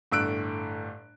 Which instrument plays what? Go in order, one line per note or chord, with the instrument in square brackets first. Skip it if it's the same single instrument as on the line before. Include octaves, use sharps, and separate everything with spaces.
[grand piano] G1 A2 E6 F#6 D7